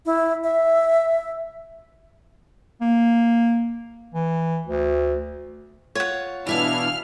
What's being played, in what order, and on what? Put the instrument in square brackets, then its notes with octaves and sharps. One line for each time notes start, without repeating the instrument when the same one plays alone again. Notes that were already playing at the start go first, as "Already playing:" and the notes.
[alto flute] E4
E5
[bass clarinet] A#3
E3
D2
[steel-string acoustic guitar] F4 [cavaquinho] C#5 F#5
[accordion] B2 D4 E4 [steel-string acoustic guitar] E3 E5 F5 [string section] F6